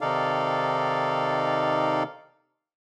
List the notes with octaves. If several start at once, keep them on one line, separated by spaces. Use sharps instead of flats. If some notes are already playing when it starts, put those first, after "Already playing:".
C3 D#3 D#4 A4 D5 F5